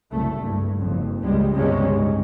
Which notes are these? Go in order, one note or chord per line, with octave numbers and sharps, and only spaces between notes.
F#1 C2 A3
G2
F#1 F2
C#2 G3 G#3
G1 C#2 C3 G3 G#3 C#4
G#2